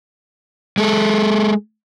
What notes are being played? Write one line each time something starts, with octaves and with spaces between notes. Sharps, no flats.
G#3 A4